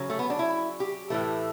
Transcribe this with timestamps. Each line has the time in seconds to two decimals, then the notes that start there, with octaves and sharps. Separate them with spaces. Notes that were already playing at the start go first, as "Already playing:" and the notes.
Already playing: C#3 F#3
0.10 A3
0.19 B3
0.30 D4
0.39 E4
0.80 G4
1.10 A2 E3 A3